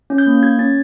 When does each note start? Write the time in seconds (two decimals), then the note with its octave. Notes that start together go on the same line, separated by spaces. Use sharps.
0.10 C#4
0.18 G6
0.26 A#3
0.43 F#4 G#6
0.59 C#4 A6